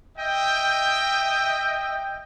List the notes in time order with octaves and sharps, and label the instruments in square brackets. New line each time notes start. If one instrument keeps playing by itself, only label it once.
[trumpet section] D#5 E5 G5